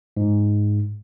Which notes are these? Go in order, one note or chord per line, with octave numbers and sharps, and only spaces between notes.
G#2